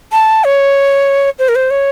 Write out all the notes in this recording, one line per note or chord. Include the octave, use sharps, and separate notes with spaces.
A5
C#5
C5
A#4
C5
C#5